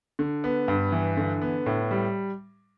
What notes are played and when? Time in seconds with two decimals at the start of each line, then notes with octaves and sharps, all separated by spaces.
0.19 D3
0.44 B3
0.68 G2
0.92 E3
1.17 D3
1.42 B3
1.66 A2
1.91 G3